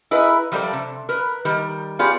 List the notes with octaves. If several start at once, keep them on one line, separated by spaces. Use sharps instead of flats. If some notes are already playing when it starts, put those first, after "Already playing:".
E4 G#4 A#4 B4 D#5
F3 G3 A3 A#4 D5
C3
A#4 B4
D#3 G3 A#4
B3 F4 G4 G#4 D5 F5